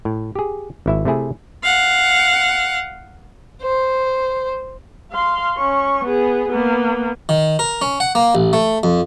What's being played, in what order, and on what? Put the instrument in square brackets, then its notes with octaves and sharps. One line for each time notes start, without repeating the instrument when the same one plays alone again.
[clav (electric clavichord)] A2
G4 G#4
G#1 E4 E5
C3 A3 E4 G#4
[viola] F5 F#5
[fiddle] C5
[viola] F5 C6
C#4 C#6
B3 G#4
A#3 B3
[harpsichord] D#3
A#4
C#4
F#5
A#3
A1
A3
F2